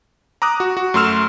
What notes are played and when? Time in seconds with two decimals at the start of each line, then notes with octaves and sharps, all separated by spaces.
0.42 A#5 D6 D#6 F#6
0.60 F#4
0.77 F#4
0.94 F#2 A3 C6 E6 F6 E7